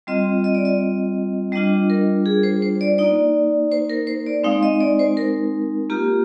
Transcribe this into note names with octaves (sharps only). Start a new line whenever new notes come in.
G3 C4 F4 D#5
D#5
D5
D#5
G3 D4 F4 D#5
A#4
G#4
C5
C5
D5
A#3 D#4 D5
C5
A#4
C5
D5
G#3 C4 D#4 F5
D#5
D5
C5
A#4
A#3 F4 G4